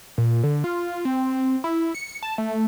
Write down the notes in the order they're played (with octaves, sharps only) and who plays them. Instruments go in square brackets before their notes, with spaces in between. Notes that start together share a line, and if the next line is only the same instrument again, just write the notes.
[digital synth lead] A#2
D3
F4
C4
E4
C#7
A5
A3